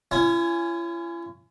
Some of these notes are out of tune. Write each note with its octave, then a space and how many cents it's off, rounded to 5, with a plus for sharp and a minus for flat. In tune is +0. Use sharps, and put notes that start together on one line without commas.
C#4 +0 E4 +45 G#5 +0